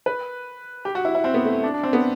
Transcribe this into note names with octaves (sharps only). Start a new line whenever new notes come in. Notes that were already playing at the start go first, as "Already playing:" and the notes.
B4
G4
F#4
E4
E4
C4
B3
A3
D4
D4
C4
B3